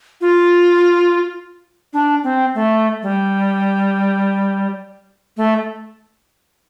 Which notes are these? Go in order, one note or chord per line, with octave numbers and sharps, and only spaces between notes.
F4
D4
C4
A3
G3
A3